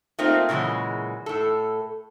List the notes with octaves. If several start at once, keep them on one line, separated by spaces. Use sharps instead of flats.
A3 A#3 C4 D#4 F4
A#2 C#3 E3 F#3 G#3
A2 A4